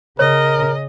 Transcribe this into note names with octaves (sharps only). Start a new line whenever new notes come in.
C#3 A#4 C#5 D#5